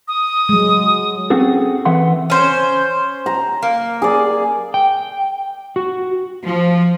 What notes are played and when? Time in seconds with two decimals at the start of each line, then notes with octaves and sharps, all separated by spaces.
0.08 D#6
0.49 F#3 G#3
1.30 C4 C#4 F#4 G#4 A4
1.85 E3 E5 F#5 C6
2.30 C#4 C5
3.26 A#5
3.63 A#3
4.02 G#4 D5
4.74 G5
5.76 F#4
6.45 F3